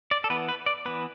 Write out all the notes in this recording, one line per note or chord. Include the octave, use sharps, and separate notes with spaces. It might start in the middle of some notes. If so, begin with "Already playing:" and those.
D5
A4
E3 B3 B4
B4
D5
E3 B3 B4